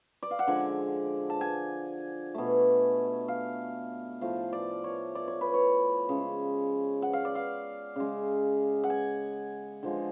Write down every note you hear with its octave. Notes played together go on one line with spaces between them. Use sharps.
D5
F5
F#5
D3 F3 G#3 G#5
A5
G#5
B2 A3
F5
A2 F3 A3 F5
D5
C#5
D5
C#5
B4
C#5
C#3 G#3
F#5
F5
D5
F5
C#3 G#3
F#5
G#5
D3 F3 G#3